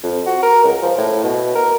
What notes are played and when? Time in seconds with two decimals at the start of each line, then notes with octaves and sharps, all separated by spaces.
0.03 F2
0.26 F#4
0.42 A#4
0.64 C#2
0.82 F3
0.98 A2
1.24 B2
1.55 A#4